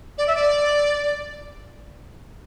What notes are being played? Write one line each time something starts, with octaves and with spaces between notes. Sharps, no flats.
D5
E5
D5